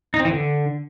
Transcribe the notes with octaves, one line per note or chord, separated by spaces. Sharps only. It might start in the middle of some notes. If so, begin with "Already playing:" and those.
D#4
C4
E3
D3